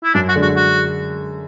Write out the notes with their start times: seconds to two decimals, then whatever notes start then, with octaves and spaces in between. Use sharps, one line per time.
0.04 E4
0.14 F#2 D4
0.28 F#4
0.35 D3 G#3
0.42 F#4
0.56 F#4